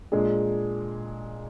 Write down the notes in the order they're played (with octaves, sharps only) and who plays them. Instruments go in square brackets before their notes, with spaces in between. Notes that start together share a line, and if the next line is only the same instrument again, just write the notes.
[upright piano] A#2 G#3 D4 G#4